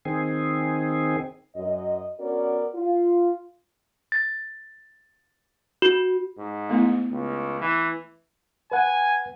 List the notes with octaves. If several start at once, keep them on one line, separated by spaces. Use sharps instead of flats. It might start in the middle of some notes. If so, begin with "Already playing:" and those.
D#3 C4 G#4
F#2 D#5
B3 C#4 F#4 A#4 D5
F4
A6
F#4
G#2
A3 B3 E4
C#2
E3
B4 F#5 G#5